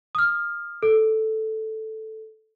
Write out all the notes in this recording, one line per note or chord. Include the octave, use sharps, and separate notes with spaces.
D#6 F6
A4